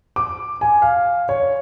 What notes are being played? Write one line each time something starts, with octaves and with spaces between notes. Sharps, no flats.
D6
G#5
F5
C#5